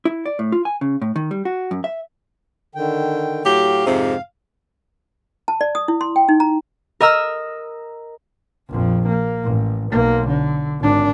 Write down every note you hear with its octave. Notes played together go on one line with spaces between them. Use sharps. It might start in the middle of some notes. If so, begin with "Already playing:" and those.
E4
D5
A2
F4
G#5
C#3
A2
D#3
G3
F#4
F#2
E5
D3 D#3 G5
A2 F#3 G4 F5
F2 G#2 C3
A5
D5
D#6
E4
C6
G5
D#4
A#5
A#4 D#5 A#5 E6 F6
A#1 F2
A#3
A1
B1 A#3
D3
G#1 D4